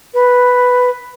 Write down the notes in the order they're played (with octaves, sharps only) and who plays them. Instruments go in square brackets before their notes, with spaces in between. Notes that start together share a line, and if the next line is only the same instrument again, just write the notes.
[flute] B4